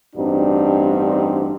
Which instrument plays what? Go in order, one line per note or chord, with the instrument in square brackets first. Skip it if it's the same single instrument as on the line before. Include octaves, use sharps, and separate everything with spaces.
[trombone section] A1 G2 C4 D4 D#4 F#4